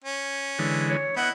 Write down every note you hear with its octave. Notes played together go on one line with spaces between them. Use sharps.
C#4
D3 E3 G#3
C#5
B3 E4 D#5 F#5